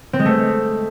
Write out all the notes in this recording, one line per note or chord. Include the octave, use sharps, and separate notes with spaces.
C4
G#3
A3